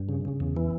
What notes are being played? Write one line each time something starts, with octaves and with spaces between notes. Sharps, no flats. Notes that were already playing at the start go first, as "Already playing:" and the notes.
Already playing: G2
C#3
C#3
E2
E3